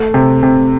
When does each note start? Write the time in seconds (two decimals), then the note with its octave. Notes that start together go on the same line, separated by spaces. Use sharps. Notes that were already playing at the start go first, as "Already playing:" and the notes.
Already playing: A3
0.14 C3
0.43 C3